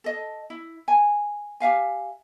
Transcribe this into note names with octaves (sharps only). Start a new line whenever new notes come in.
A4 D#5
E4
G#5
G4 E5 F5 G#5